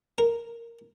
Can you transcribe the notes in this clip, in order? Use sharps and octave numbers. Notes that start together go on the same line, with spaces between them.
A#4